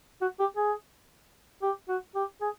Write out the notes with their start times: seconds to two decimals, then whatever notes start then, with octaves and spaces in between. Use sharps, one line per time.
0.22 F#4
0.40 G4
0.57 G#4
1.63 G4
1.89 F#4
2.16 G4
2.42 G#4